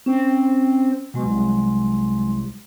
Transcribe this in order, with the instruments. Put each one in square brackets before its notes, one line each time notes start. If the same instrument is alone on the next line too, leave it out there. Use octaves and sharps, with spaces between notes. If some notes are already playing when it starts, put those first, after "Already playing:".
[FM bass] C4 [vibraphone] C#4
[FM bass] B2 [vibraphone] F#3 G#3 C6
[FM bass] C2